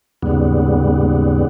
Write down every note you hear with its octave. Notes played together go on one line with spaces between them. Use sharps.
D#2 G#2 C#3 G3 B3